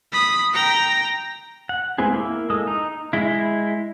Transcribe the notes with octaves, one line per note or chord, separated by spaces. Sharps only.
B5 D#6
G5 A#5
F#5
G#3 B3 C4 E4 G#4
A#3 E4
G#3 A4 D#6
D#4
G#3 E4